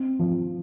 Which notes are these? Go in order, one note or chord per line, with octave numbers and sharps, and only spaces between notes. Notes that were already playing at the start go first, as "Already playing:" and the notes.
Already playing: C4
F3